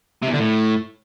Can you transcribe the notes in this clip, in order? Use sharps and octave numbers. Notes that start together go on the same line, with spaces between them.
C3
E2
D3
A2